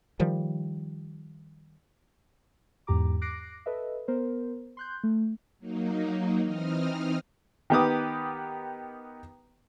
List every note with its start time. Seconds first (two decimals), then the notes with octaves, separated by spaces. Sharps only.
0.20 D#3 F3 G3
2.87 E2 G#2 G4 A#5 D6
3.21 D6 F#6 A#6 C7 D7
3.66 A4 B4 D#5 E5
4.08 B3 A#4 C5
4.77 C6 F#6 G6
5.03 A3
5.59 F#3 A#3 D#4
6.44 E3 C4 D#4 D#6 F6
7.70 D#3 B3 G4 B4 D6 D#6